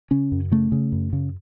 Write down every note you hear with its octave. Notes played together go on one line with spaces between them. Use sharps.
C#3 C#4
F#2
C#3 A3
C#3
F#2
C#3